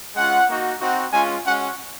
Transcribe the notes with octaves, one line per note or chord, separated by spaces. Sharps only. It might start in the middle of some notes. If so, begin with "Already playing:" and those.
G#3 C#4 F4 F#5
A#3 D#4 F#4
C4 D#4 F#4
G#3 C#4 F4 G#5
G#3 C#4 F#4 F#5